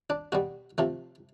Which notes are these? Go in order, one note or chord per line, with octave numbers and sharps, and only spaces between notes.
D4
B2 G3 F#4
C3 F3 A3